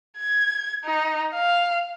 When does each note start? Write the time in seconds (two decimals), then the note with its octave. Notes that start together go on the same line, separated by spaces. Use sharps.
0.18 G#6
0.84 D#4
1.35 F5